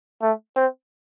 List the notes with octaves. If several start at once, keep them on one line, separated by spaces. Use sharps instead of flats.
A3
C4